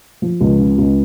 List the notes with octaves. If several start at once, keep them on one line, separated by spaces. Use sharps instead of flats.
F3
C#2
C#3
C#2